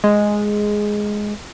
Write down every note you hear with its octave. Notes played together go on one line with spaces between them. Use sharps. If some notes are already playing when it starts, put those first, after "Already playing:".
G#3